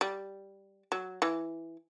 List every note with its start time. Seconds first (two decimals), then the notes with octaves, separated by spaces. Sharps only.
0.01 G3
0.92 F#3
1.22 E3